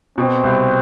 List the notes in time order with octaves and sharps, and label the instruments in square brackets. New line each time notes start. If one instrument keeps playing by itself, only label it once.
[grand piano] B2 [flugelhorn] C4
[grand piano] C2